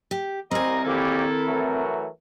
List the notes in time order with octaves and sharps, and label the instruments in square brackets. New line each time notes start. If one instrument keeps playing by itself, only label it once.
[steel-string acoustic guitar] G4
[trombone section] C2 [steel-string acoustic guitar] C4 G#5 [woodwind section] G4 A#4 D#5 [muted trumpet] A#5
[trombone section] A#1 A#3 G4 [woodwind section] D#3 E4 A4 [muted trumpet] A#4
[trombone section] E3 F#3 A3